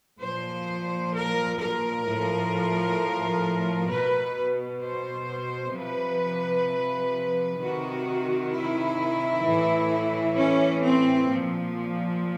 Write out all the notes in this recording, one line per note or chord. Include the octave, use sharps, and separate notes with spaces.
A#2 F3 C5
A#4
A#4
A2 F3
B2 B4
C5
C3 F3 B4
C3 D#3 F#4
E4
A2 E3
C#4
C4
A#2 F3